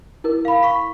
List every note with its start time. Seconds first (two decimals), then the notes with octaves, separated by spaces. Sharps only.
0.24 E4 A#4
0.45 F5 B5
0.63 B5 C#6 B6